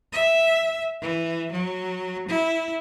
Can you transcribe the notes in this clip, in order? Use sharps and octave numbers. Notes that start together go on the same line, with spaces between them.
E5
E3
F#3
E4